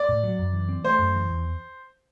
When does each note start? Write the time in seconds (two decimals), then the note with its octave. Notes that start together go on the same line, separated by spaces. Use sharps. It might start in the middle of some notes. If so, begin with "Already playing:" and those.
Already playing: D5
0.09 A2
0.23 F#3
0.39 F#2
0.53 E3
0.69 C4
0.84 A3 C5
0.99 F#2
1.14 E3
1.29 E2